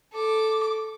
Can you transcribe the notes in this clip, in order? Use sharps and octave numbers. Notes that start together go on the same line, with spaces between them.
A4 D6